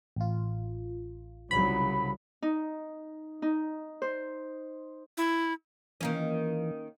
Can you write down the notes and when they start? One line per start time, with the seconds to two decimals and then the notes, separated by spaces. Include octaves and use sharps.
0.16 A1 F4
1.51 C2 C#3 F#3 B5
2.42 D#4
3.42 D#4
4.02 C5
5.17 E4
6.01 D#3 E3 A#3 C#4